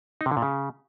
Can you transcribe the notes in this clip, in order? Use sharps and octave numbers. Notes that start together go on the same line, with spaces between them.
D#4
C3
D3
A#2
C#3